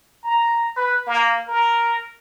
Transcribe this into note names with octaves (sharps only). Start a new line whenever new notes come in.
A#5
B4
A#3
A#4